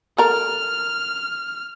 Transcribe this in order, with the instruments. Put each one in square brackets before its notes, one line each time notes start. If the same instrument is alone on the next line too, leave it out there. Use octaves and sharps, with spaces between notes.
[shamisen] A4 A#4 [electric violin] F6